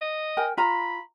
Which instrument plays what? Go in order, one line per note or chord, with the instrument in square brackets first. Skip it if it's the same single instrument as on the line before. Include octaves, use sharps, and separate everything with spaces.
[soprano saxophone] D#5
[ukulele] A#4 G5 G#5
[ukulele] F4 A#5 [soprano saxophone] B5